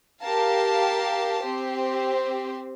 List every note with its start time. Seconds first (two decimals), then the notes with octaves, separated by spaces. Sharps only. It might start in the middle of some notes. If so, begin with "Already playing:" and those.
0.23 G4 A#4 F5 A5
1.42 C4 G4 C5